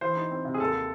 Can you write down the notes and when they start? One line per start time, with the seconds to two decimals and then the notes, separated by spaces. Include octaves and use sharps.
0.01 E3 C5
0.17 D#4
0.31 C4
0.45 C3
0.54 G#4
0.60 D#2 A4